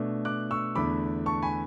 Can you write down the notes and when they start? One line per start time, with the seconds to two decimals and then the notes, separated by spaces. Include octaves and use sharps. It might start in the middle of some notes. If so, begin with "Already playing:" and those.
Already playing: B2 A3 D4
0.25 D6 F#6
0.51 C#6 E6
0.75 E2 D3 A3 B5 D6
1.26 A5 C#6
1.42 G#5 B5